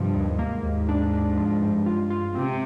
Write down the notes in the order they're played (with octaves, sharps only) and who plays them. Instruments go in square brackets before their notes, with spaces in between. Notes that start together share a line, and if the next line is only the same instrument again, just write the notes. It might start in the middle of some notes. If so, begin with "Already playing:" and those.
Already playing: [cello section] G2 [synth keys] C3 F3
[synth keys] D#2
[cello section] G#2 [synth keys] A#3
[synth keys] D#2
D4
D4
F3
G2
F4
F4
[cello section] C3 [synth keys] C4